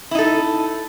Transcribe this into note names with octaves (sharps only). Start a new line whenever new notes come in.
D#4 E4 A4